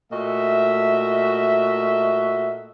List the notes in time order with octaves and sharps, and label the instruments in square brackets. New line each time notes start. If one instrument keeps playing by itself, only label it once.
[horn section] A#2 A3 F#4 D#5 E5